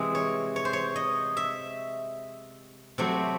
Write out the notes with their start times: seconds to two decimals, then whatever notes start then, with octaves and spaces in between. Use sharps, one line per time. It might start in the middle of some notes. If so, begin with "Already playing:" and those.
Already playing: C3 E3 G#3 C4 D#5
0.15 C#5
0.56 C#5
0.65 C5
0.73 C#5
0.96 D#5
1.37 E5
2.98 C3 F#3 A3 C4